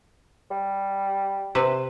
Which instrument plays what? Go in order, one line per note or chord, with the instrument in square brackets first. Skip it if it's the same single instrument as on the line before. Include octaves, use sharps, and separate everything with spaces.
[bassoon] G3
[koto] C3 B4 E5